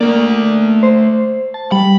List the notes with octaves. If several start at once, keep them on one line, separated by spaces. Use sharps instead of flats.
A3 A#3 D5
C5
A5
G3 B5